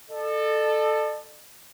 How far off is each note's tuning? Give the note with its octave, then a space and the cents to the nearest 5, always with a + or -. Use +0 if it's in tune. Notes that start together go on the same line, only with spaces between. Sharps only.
A4 +0 D5 +45